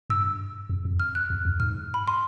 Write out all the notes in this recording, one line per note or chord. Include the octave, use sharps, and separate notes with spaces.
G2 E6
F2
F2
F6
F#6
E2
F2
G#2 F6
B5
C6